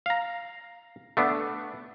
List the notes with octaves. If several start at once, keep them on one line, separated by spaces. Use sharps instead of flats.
F5 A#5
A3 B3 D4